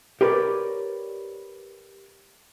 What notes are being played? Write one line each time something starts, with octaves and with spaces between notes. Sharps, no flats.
G4 A#4 B4 C#5 D5